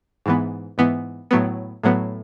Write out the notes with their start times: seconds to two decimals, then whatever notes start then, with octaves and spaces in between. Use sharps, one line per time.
0.26 G#2 E3 B3
0.78 G#2 E3 B3
1.31 A2 F#3 B3
1.83 A2 F#3 B3